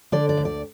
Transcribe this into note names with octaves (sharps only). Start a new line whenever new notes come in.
D3 D5
D5
D2
D5